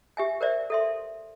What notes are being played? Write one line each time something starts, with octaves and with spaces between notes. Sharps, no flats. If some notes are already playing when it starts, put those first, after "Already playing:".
G4 E5 G#5
A#4 C5 D5 E5
A4 E5 C6